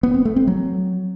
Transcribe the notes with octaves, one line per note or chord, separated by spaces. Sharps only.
B3
C4
A3
C4
F#3